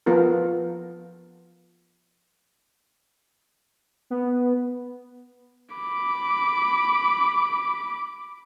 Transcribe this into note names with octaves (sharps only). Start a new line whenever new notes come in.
F3 B3 F4 A4 A#4
B3
B5 D6